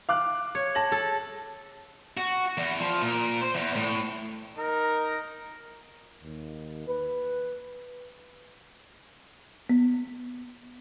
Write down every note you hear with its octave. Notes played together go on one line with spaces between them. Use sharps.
F5 D6 F#6
C#5
A5 A#6 F#7
A4
F#4
E2
F3
A#2
C5
E2
A2
D#4 A#4
D#2
B4
B3